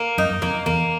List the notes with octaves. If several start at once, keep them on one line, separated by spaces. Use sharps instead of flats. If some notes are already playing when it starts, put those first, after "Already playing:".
Already playing: A#3
F#2 D#4
F#2
F2 A#3
E2 A#3